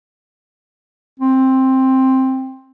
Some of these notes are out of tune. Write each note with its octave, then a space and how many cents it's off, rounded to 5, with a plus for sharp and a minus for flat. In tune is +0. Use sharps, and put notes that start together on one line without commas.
C4 +10